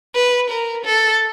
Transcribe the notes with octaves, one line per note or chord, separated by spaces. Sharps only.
B4
A#4
A4